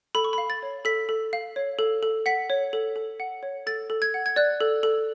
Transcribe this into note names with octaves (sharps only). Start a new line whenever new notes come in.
A4 B5
C#6
B5
F5
A6
C#5
A4 B6
A4
F5
C#5
A4
A4
F#5 B6
C#5
A4
A4
F#5
C#5
A4 A6
A4
G#6
F#5
G#6
D5 F#6
A4
A4